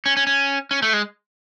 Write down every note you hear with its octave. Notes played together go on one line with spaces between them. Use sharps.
C#4
C#4
C#4
C#4
A3
G#3